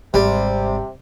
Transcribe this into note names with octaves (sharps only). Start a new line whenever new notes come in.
G#1 C3 G3